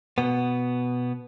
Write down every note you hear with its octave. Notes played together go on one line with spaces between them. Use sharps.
B2 B3